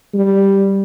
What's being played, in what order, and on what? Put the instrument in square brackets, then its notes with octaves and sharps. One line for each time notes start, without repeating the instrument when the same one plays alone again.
[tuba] G3